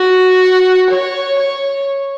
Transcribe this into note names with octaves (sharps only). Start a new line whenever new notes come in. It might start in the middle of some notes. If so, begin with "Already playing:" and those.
Already playing: F#4
C#5
C#5